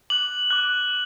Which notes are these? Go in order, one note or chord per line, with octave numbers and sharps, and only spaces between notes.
D6 F#6 F#7
D6 F#6